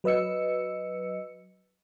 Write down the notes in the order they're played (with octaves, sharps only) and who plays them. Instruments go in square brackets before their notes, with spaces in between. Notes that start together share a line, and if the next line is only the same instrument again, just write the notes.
[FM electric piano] F#3 B4 D#5 E6 C#7